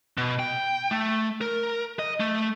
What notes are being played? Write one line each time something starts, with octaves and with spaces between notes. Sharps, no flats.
B2
G5
A3
A#4
D#5
A3